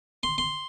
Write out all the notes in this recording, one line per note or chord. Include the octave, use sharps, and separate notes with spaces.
C6
C6